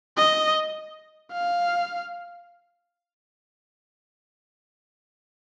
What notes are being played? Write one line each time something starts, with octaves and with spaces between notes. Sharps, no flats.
D#5
F5